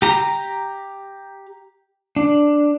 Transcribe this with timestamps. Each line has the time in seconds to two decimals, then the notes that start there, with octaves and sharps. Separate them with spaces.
0.02 G4 A#5
2.16 D4